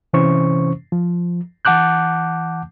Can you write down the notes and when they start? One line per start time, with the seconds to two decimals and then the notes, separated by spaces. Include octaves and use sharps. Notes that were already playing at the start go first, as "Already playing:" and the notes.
0.13 C3 E3 C#4 C5 C#6
0.92 F3
1.65 E3 F#5 A5 D6 F#6 G6